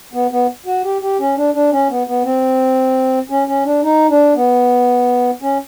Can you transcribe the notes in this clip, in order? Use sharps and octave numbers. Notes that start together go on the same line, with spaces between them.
B3
B3
F#4
G4
G4
C#4
D4
D4
C#4
B3
B3
C4
C#4
C#4
D4
D#4
D4
B3
C#4